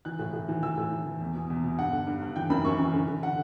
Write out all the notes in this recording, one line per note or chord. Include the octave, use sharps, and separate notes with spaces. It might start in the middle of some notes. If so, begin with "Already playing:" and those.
E3 F#6
A2
A2
E3
E3 E6
A2
E3
E3
E2
B2
E2
B2
G2 F#5
D3
G2
G2
E3 G5
F#2 B5
F#2 C#6
E3
D3
D3
D3 F#5